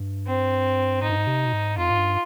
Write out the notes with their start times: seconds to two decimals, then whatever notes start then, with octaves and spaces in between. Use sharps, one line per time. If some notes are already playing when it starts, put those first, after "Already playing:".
Already playing: G2
0.27 C4
1.02 G#2 D#4
1.09 G2
1.17 G#2
1.27 C3
1.46 B2
1.53 G#2
1.77 F2 F4
1.90 G#2
1.97 G2